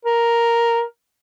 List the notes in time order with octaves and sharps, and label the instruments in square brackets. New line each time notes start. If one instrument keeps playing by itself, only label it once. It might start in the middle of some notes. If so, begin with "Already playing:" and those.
[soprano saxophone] A#4